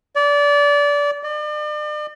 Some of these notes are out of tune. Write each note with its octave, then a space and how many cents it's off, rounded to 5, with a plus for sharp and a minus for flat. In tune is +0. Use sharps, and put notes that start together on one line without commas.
D5 -25
D5 +40